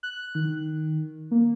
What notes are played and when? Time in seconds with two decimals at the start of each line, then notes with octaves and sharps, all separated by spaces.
0.03 F#6
0.35 D#3
1.31 A#3